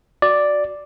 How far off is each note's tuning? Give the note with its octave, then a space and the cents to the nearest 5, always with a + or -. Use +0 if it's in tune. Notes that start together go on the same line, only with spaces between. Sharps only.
F#4 -5 D5 +0